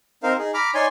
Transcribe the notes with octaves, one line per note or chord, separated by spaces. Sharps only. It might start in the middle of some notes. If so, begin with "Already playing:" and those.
C4 D#4 A#4 C5 F5
D#4 G#4
A#5 B5 D6 F6
D#4 C#5 D5 G#5 C6